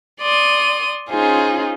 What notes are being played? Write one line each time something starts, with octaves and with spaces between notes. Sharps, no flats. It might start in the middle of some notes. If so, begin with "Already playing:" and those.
D5 C6 D#6
C#4 D#4 F4 G#4 C5